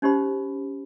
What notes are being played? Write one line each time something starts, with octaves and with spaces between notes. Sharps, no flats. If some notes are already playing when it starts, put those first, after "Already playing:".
C#4 D#4 G4 C5 B5